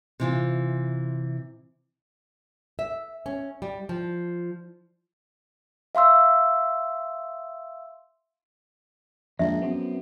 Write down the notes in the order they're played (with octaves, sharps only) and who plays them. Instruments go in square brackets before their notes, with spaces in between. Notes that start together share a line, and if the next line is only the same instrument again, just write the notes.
[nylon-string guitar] C3 E3 F4
E5
C#4
G3
F3
[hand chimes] E5 F5 C6 E6
[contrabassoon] A#1 [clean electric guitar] F2 F3 G#3 [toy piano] E5
[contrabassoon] F#2 [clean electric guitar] B3 C4